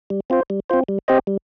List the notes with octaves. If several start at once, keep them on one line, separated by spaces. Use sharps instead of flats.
G3
C4 F4 C5
G3
C4 F4 C5
G3
C4 G4 C5 D#5
G3